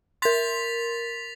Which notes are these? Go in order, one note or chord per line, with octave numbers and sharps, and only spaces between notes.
A#4 C6 A6 B6 F7